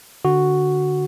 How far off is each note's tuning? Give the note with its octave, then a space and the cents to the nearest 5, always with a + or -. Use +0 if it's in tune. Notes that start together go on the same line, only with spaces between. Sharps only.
D3 +0 F#4 +0